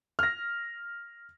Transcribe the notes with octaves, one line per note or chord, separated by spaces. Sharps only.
F6 A#6